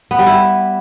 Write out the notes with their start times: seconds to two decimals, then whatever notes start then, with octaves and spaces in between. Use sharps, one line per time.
0.11 B3
0.19 G3
0.26 E4